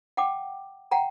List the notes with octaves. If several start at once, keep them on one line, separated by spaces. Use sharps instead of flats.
F#5 G5 A5 D6
F#5 G5 A#5